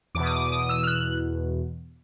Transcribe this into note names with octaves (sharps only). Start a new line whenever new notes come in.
E2 B2 D6
D#6
D6
D#6
E6
F6
F#6